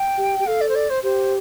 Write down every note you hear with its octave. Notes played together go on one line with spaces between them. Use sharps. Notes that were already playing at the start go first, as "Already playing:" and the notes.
Already playing: G5
G4
G4
A4 F5
D5
C5
D5
C5
G4 C5